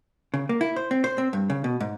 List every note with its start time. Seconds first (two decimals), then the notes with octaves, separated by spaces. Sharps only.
0.34 C#3
0.49 A#3
0.61 E4
0.76 C5
0.91 C4
1.04 C5
1.18 C4
1.33 G2
1.50 C#3
1.64 B2
1.80 G#2